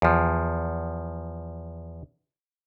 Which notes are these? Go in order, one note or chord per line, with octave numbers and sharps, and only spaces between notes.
E2 F3